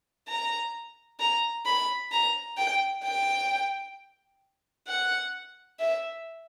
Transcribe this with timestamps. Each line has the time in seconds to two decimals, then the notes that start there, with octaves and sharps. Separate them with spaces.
0.28 A#5
1.19 A#5
1.66 B5
2.11 A#5
2.57 G5
3.03 G5
4.87 F#5
5.80 E5